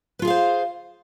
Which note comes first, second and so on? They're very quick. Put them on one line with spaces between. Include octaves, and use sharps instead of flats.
B4 F4 G#4 F5 C5